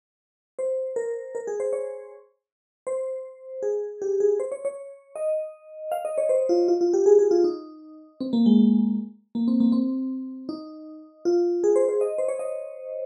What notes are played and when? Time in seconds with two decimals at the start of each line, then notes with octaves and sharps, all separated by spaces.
0.59 C5
0.96 A#4
1.35 A#4
1.47 G#4
1.60 C5
1.73 C#5
2.87 C5
3.63 G#4
4.02 G4
4.20 G#4
4.40 C5
4.52 C#5
4.65 C#5
5.16 D#5
5.92 F5
6.05 D#5
6.18 C#5
6.29 C5
6.49 F4
6.68 F4
6.81 F4
6.93 G4
7.06 G#4
7.19 G#4
7.31 F4
7.44 D#4
8.20 C4
8.33 A#3
8.46 G#3
9.35 A#3
9.48 C4
9.60 A#3
9.72 C4
10.49 D#4
11.25 F4
11.64 G#4
11.76 C5
11.88 C5
12.01 D#5
12.18 C5
12.28 C#5
12.39 D#5